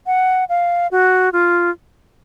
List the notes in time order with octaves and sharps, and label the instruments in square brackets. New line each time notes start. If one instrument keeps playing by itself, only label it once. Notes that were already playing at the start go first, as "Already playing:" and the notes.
[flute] F#5
F5
F#4
F4